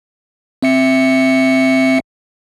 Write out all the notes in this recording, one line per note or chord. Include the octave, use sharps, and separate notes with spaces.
C4 E5 C#7